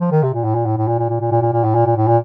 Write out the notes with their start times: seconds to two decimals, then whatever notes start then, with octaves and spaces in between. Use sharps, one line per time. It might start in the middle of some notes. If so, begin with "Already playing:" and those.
0.01 F3
0.12 D#3
0.23 C3
0.34 A#2
0.44 A2
0.55 A#2
0.65 A2
0.77 A2
0.87 A#2
0.99 A#2
1.10 A#2
1.21 A#2
1.32 A#2
1.42 A#2
1.53 A#2
1.64 A2
1.75 A#2
1.86 A#2
1.96 A2
2.07 A#2